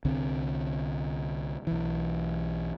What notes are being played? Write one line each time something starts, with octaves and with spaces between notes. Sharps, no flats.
C2 D3 C4
B1 E3